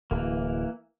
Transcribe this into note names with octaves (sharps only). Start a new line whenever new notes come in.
D1 E3 A#3